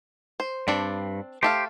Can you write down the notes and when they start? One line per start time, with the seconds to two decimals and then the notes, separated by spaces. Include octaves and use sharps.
0.40 C5
0.68 G2 C4 D4 D5
1.43 A3 G4 A4 C5 F5